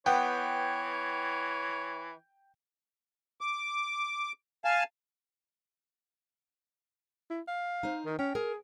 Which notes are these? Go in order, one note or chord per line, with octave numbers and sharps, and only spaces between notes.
E3 B3 C#5 G5
D6
F5 G#5 A5
E4
F5
D#4 C5
D#3
C#4 G5
G#4 A#4